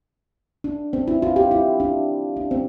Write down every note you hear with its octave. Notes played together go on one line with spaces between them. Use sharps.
D4
C4
E4
F4
G4
E4
D4
D4
C4